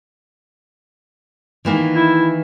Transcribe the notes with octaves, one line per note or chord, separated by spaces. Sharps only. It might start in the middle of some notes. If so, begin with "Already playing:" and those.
D#3 E3 A#3
E4